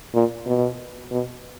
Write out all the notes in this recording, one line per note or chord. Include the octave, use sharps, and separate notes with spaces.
A#2
B2
B2